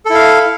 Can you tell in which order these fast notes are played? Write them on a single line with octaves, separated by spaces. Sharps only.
A4 E4 F5